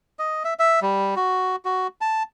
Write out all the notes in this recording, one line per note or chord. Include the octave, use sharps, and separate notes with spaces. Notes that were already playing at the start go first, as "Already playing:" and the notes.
D#5
E5
E5
G3
F#4
F#4
A5